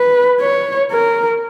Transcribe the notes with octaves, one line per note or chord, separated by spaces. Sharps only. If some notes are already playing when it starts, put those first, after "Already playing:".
Already playing: B4
C#5
A#4